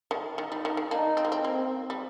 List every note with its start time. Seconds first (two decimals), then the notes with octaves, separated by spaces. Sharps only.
0.11 D#3
0.38 D#3 D#4
0.52 G3
0.65 D#3
0.77 D#3
0.91 A#3 D4 D#4
1.17 C4
1.25 A#3
1.32 C4
1.43 A#3 C4
1.90 G3